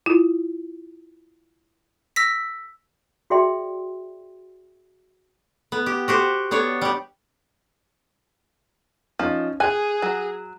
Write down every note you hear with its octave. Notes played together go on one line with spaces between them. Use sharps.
E4 F4
E6 A#6 B6
F#4 G#4 D5 E5 G5 C6
B3
G4
F#4 G4 C5
B3 D4 C#5
G3 G4
F3 C#4 D#4
G#4 G#5 F#6
F#3